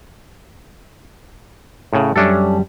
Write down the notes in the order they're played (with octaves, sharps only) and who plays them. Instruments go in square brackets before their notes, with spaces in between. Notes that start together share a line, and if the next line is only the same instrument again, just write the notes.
[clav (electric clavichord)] A2 C#3
[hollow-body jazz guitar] F#2 G3 E5 [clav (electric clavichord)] C#4 D4 A4